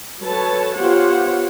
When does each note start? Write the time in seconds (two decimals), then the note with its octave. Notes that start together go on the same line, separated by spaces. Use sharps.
0.22 F#3 A4 B4 C#5 A5
0.76 B3 F4 G4 C5 C#5 F#5